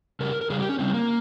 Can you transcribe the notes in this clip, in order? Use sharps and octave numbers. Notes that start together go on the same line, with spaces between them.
C#3 G3 A#4
A#4
C#3 G3 G#4
G4
C#4
C#3 G3 C4
A#3